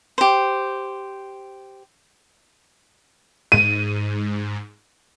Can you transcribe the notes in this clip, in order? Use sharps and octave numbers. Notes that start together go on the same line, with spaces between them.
G4 C5
G#2 D#7